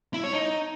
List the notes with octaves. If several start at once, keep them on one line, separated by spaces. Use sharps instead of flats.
E4
C#5
D#4